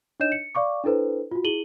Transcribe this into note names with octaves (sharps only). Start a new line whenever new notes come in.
D4 D#4 C#5 D#5 G6 E7
C#7
D5 F5 C#6 D6
D4 E4 A4 B4 C5
F4 F#4
E4 G#4 D#7 F#7 G7